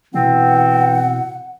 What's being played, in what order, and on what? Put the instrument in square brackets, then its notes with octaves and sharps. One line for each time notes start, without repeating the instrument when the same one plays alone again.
[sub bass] B2 [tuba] E3 [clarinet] C4 [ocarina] F#5